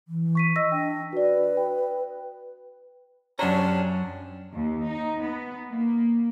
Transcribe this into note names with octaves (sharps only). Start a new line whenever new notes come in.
E3
C#6 B6 D#7
D#5 E6 A#6
D4 G5
F#4 B4 D5
G5
F#2 C3 C#4 D4 A#5
D#2
D#4
B3
A#3